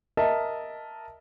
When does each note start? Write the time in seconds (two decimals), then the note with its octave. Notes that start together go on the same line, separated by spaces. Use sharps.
0.17 A#4 D#5 E5 A5